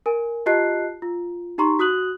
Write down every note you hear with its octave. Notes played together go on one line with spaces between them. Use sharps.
A#4 G#5
F4 G4 D#5 A5 F#6 C7
F4
D#4 G4 A#5 C6 C#6
F#4 D#6 F#6 F#7